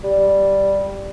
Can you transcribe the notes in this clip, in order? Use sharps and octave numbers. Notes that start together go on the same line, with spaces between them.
G3